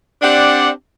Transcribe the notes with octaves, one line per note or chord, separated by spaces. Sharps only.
C4 D4 G4 D5 F#5